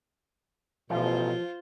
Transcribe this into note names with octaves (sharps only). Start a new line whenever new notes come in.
A1 B2 F3 F4 C5